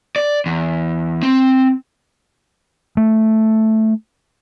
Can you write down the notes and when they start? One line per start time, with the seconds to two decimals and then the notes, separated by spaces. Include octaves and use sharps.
0.16 D5
0.46 E2
1.23 C4
2.97 A3